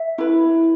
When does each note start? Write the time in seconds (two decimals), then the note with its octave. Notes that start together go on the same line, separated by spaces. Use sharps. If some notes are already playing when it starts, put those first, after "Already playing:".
Already playing: E5
0.18 E4 B4